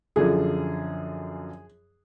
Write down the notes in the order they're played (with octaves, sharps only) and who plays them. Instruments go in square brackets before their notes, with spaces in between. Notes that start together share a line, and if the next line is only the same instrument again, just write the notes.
[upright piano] F#2 D3 F3 G#4